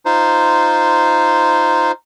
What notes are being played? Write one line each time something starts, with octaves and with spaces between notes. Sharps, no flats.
D#4 F4 C5